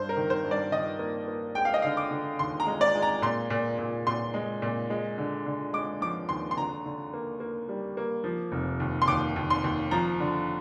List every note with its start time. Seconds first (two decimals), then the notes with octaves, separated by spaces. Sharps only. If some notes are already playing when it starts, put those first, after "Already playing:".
Already playing: G2 C5
0.09 A#4
0.17 D#3
0.30 C5
0.45 G2
0.51 D5
0.72 D#3 D#5
0.99 A#3
1.28 A#3
1.55 G#3 G5
1.65 F5
1.74 D#5
1.82 D3 F5
1.97 D6
2.11 D3
2.39 D#2 C6
2.60 A#5
2.66 G#3
2.81 D5
2.95 G#3
3.02 A#5
3.22 A#2 C6
3.50 A#2
3.79 A#2
4.07 A#2 C6
4.34 G#3
4.62 A#2
4.90 G#3
5.18 D3
5.46 D3
5.73 G#3 D6
6.01 F3 D6
6.29 D#2 C6
6.51 C6
6.57 D3 A#5
6.86 D3
7.14 A#3
7.40 A#3
7.69 G3
7.97 A#3
8.24 F3
8.52 F1
8.80 D#2
9.02 C6
9.08 D#2 D6
9.36 D#2
9.50 C6
9.64 D#2
9.91 F3 A#5
10.20 D3